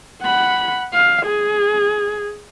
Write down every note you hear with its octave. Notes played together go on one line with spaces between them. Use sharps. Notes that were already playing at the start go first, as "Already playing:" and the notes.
F#5 B5
F5
G#4